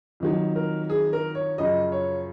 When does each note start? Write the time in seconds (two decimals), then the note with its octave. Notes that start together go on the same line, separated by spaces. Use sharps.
0.20 F2 D#3 F#3
0.56 A#4
0.89 G#4
1.13 A#4
1.35 C#5
1.58 F#2 C#3 F3 D#5
1.92 C#5